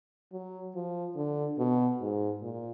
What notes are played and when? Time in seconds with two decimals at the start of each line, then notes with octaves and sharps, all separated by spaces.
0.32 F#3
0.75 F3
1.16 D3
1.58 B2
2.01 G#2
2.42 A#2